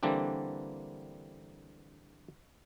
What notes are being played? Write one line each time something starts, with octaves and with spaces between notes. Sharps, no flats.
D3 E3 G3 A#3 C4 D4